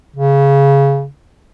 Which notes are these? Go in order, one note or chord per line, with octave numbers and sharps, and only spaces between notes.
C#3